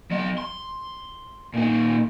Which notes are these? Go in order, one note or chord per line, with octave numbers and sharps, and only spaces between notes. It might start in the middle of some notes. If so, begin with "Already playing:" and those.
F#3 D#5
C6
A#2 D#4